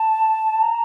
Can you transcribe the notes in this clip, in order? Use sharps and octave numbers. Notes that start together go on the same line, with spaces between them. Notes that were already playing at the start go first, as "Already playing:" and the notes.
Already playing: A5
A#5